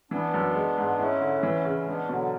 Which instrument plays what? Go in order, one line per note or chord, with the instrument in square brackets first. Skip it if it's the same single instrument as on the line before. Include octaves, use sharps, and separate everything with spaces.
[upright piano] E3 [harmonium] B3 D4
[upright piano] F#2
G#3
G#2
[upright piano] G#3 [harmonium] C#4 E4
[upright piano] D3
E3
C#3
[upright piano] G#3 [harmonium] B3 D4
[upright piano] B2 [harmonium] D3 F#3